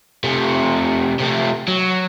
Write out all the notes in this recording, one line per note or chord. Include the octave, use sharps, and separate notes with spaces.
C3 A3
C3 A3
F#3